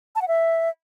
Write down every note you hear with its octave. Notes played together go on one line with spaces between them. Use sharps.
A5
F#5
E5